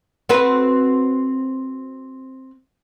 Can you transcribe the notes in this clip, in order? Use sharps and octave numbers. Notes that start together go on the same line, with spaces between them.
C4 F#4 B4